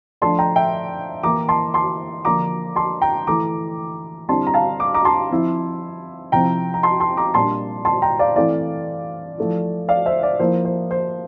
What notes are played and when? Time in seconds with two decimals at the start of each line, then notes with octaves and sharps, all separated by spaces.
0.22 F3 A3 D4 A5 C6
0.39 G5 A#5
0.56 E5 G5
1.23 E3 A#3 E4 A#5 D6
1.49 A5 C6
1.74 A5 C6
2.25 D3 F3 A#3 D4 A#5 D6
2.76 A5 C6
3.01 G5 A#5
3.27 E3 A3 E4 A#5 D6
4.29 D3 G3 C4 E4 A5 C6
4.47 A#5
4.54 F5 A5
4.80 D6
4.94 A#5 D6
5.05 A5 C6
5.31 F3 C4 E4
6.32 C3 F3 C4 E4 G5 A#5
6.74 A#5
6.83 A5 C6
7.00 A5 C6
7.17 A#5 D6
7.34 A#2 G3 D4 A5 C6
7.85 A5 C6
8.02 G5 A#5
8.19 D5 F5
8.36 E3 A3 C4 E4 D5 F5
9.38 F3 A3 E4
9.88 D5 F5
10.06 C5 E5
10.23 D5
10.39 F3 A#3 E4 C5
10.65 C5
10.91 C5